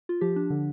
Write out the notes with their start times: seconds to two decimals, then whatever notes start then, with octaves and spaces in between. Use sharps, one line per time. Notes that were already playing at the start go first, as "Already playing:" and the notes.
0.09 F4
0.21 F3 G4
0.36 D4
0.50 D3